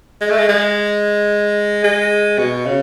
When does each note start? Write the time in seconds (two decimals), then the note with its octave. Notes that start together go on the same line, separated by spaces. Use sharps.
0.21 G#3
0.30 A3
0.38 G#3
0.49 G#3
1.84 G#3
2.39 B2
2.66 C#3